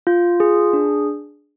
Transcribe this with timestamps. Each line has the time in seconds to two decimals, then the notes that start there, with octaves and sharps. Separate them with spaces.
0.07 F4
0.40 G#4
0.73 D4